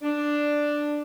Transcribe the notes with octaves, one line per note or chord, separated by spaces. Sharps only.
D4